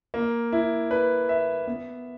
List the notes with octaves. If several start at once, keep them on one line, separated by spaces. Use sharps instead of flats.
A#3
E4
B4
E5
B3